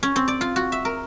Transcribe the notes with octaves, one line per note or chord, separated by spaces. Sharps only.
C#4
C4
D5
F4
F#4
E5
A#4